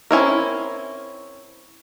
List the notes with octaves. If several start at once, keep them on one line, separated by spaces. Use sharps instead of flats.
C4 C#4 E4 A#4